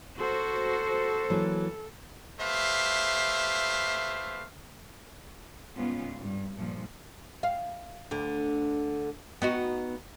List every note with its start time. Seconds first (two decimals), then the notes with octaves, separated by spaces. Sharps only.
0.18 F#4 A4 C5
1.30 E3 F#3 A#3
2.40 A3 G4 B4 C5 E5 F5
5.75 G#2 C#3 G3 B3 C#4 F4
6.18 G2
6.56 G2 A#2 F3
7.43 F5
8.11 D2 D3
9.42 B3 D#4 F#4